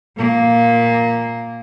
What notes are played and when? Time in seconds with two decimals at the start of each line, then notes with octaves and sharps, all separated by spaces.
0.17 A#2 A#3